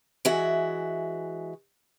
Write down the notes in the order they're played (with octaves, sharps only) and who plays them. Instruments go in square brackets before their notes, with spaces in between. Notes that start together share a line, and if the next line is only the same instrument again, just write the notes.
[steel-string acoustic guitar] E3 G#3 F#4 E5